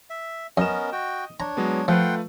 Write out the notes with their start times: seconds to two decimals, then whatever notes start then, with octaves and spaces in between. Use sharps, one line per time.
0.10 E5
0.57 F#2 B3 C#4 A#4 D#5 E7
0.92 F#4 G5
1.40 D4 C#5 A#5
1.57 F#3 G#3 B3
1.88 F3 A3 F4 B4 F#5 G5 C6